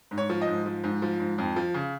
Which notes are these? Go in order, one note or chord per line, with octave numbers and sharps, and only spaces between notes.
G#2
C#5
F3
D#5
G#2
F3
G#2
F3
G#2
F2
F3
C#3